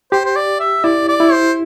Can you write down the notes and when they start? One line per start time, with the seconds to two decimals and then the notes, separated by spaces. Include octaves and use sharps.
0.12 G4 C5
0.25 C5
0.36 D5
0.60 E5
0.84 E4 D5
1.08 D5
1.20 E4
1.32 C5